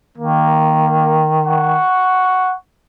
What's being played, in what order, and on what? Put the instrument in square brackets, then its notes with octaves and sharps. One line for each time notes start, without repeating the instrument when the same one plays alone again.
[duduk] D#3 [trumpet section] A#3
[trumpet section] F#5 C#6